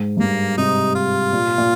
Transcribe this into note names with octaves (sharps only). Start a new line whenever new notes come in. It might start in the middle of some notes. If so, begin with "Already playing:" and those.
Already playing: G#2
G2
G#2 A#3
C3 D#4
F4
A#2
A#2